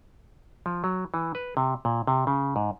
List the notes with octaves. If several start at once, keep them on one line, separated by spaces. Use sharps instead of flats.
F3
F#3
E3
B4
C3
A#2
C3
C#3
G#2